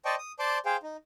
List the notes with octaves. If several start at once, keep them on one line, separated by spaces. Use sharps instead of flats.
C5 D5 D#5 G5 A5 C#6
D#6
C5 D5 A5 C6 D6
G#4 C5 F5 G5
D#4